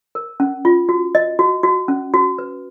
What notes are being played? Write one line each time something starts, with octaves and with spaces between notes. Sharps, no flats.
A#4
C#4
F4
F#4
D#5
F#4
F#4
C#4
F#4
B4